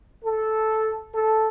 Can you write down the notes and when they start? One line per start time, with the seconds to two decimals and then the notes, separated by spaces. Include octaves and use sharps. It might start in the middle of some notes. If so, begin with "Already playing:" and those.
0.24 A4
1.13 A4